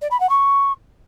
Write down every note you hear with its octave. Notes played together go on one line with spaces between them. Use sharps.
D5
B5
F#5
C#6